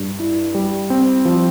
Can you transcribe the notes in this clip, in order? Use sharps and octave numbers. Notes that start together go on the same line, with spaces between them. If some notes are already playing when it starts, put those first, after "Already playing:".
Already playing: G2
E4
G3
C4
F3